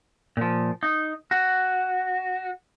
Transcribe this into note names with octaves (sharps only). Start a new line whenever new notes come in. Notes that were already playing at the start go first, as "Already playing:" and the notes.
A#2 F3
D#4
F#4